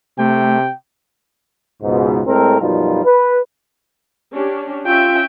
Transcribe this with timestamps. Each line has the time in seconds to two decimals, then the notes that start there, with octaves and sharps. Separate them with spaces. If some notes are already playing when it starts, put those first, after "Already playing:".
0.19 C3 A3 G5
1.83 C#2 G#2 B2
2.26 A2 G#3 C4 A4 A#4
2.60 F#2 B2 F3 G3 D#4 F4
3.04 B4
4.35 C#4 D4 G4
4.86 C#4 F4 E5 G5